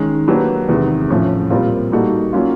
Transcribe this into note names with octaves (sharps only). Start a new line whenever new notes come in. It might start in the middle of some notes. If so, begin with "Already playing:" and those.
Already playing: D#3 G#3 C#4
F#3 A#3 D4 G4 B4
E2 C3 D#3 G#3 B3
A2 F3 A3 C#4
A#2 G3 C4 F4 A#4
G3 A#3 D#4 F#4 A4
F#3 A#3 C#4 F4